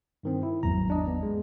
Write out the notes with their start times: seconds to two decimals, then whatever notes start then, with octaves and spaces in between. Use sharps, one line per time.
0.23 G2 D#3 C4
0.43 E4
0.63 G#1 E2 F#3 A#5
0.90 D4 D#5
1.07 B3
1.23 G#3